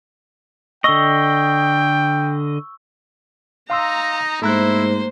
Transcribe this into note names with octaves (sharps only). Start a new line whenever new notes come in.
D3 D#5 G5 C#6 E6 G7
D#4 F5 A#5 C6 E6
G#2 A3 A#3 E4 C5 A#5 F#6